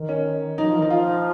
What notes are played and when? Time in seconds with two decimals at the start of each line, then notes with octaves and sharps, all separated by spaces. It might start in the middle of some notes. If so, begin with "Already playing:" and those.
Already playing: D#3
0.09 C#4
0.58 F#3 D#4
0.69 F3
0.78 D#3 D#4
0.90 F3 F4
1.08 D#4